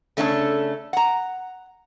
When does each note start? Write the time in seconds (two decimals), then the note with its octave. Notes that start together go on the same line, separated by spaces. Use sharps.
0.17 C#3 A3 C#4 D4 E4 A4
0.93 F#5 A#5